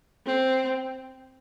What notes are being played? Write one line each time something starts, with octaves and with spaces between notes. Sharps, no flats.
C4